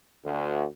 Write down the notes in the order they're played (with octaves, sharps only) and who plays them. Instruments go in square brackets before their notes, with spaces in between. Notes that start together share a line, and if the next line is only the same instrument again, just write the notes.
[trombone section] D2